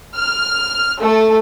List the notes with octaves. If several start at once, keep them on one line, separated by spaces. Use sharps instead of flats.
F6
A3